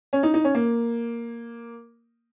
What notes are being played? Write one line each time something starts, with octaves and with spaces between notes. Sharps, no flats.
C#4
D#4
D#4
C#4
A#3